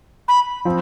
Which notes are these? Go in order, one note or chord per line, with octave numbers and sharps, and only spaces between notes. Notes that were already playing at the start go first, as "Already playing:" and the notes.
B5
F3 C4